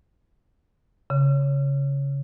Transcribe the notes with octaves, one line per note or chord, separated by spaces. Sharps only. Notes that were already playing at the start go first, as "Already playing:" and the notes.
C#3